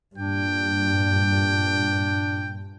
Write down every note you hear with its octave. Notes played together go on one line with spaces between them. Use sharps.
G2 A#2 D4 G5